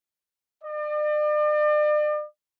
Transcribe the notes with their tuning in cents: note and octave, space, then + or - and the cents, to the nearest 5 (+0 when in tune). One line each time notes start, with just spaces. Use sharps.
D5 +40